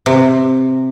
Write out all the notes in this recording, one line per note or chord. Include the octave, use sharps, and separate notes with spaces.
C3